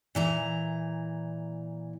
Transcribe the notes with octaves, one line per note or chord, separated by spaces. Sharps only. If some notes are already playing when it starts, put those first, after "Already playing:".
A#2 E3 A#5